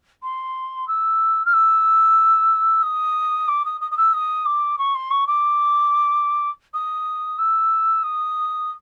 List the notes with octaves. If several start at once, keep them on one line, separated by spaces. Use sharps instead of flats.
C6
E6
F6
E6
D#6
D6
D#6
D#6
D#6
E6
D#6
D6
C#6
C6
C#6
D6
D#6
E6
D#6